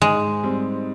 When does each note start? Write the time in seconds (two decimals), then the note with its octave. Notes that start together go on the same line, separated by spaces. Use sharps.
0.02 G#2 G#3
0.43 G3 C4